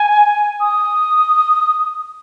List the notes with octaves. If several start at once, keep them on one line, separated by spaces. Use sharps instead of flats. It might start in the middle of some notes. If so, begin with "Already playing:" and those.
Already playing: G#5
D#6